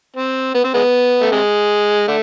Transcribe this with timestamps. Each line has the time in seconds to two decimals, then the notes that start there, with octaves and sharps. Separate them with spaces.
0.16 C4
0.55 B3
0.64 C4
0.74 G#3 B3
1.21 A3
1.32 C3 G#3
2.08 D3 A3